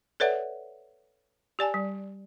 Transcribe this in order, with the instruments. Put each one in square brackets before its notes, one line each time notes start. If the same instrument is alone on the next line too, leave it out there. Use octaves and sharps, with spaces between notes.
[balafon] A4 B4 C#5 D5 E5 F#5
G4 D5 G#5 A5
G3